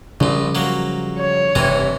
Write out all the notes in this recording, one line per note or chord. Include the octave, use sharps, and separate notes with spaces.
A#1 A#2 C#3 F3 G3
F#3 A#3
C#5
F1 G2 C3 E3 A#5